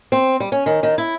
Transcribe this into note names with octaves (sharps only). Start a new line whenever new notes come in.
C4
G3
C#4
D#3
D#3
E4